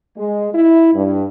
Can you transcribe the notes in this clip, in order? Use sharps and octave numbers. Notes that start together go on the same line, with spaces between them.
G#3
E4
G2